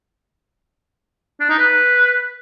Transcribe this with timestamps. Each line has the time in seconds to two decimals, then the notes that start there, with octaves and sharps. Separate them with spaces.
1.40 D4
1.50 D#4
1.59 B4